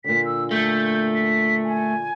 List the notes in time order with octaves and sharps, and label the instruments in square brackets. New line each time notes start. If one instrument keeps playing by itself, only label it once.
[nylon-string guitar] A#2 D3 [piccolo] B6
[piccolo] E6
[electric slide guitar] A3 [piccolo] G6
[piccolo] B6
G#5